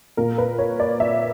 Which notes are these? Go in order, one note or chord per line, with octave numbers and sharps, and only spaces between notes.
A#2 A#4
B4
C#5
D5
E5